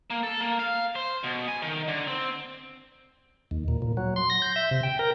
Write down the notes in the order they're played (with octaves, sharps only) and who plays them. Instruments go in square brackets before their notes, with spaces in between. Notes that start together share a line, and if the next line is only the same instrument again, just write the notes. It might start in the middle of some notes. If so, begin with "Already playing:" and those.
[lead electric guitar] A#3
A4
A#3
F5
C5
B2
G#5
D#3
D3
C4
[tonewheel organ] D#2
A#2
A#2
F#3
C6
A#6
G6
E5
C3
G5
A#4